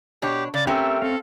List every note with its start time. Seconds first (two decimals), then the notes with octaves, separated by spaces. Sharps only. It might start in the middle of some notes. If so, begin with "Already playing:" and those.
0.22 B2 D4 G4 C#5
0.54 C#3 D5
0.67 A3 C4 C#4 G4 A#4 E5
1.02 C4 A4 F5